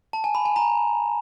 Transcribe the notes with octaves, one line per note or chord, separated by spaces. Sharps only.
A5
G#5
B5
G#5
A#5